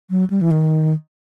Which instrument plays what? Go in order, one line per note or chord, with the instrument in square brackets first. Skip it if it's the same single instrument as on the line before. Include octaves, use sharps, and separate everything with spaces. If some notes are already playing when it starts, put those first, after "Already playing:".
[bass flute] F#3
G3
E3
D#3